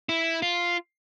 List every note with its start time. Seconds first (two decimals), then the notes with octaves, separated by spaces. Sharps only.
0.09 E4
0.42 F4